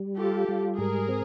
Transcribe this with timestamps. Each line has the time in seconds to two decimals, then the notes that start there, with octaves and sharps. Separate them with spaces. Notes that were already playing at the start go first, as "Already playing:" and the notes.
Already playing: G3
0.17 F4 G4 A4
0.48 G3
0.78 G#2 G#4 A#4
1.09 C4